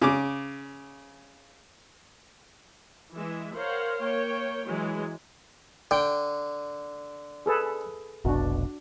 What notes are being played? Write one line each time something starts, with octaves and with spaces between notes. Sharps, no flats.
C#3 D6
E3 G#3 E5
A#4 C5 C#5 F5 F#5
A#3 C#5 G5
E3 F#3 G#3
D3 G5
G#4 A4 B4
F1 B1 B2 D4 F#4